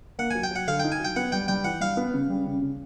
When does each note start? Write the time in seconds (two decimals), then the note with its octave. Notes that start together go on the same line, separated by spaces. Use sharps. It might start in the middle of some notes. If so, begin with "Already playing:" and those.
0.19 A#3 F#5
0.31 F#3 G#5
0.43 G5
0.51 F#3 F#5
0.68 D3 F5
0.80 D#4 G5
0.92 G#5
1.00 F#3 G5
1.16 B3 F#5
1.32 G3 G5
1.48 G3 G5
1.64 E3 F#5
1.80 G3 F5
1.97 B3
2.14 C#3
2.30 G3
2.46 C#3
2.62 C#3